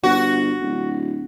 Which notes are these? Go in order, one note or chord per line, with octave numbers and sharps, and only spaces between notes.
G1 F#4
D1